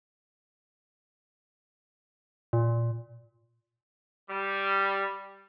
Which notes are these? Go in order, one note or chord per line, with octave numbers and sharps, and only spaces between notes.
A#2
G3